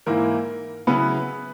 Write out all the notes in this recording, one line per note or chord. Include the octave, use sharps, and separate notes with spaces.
G#2 E3 A#3 E4 A#4
C#3 F#3 B3 E4 B4